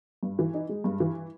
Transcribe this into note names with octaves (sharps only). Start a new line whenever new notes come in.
G2
E3
D#4
G#3
G2
E3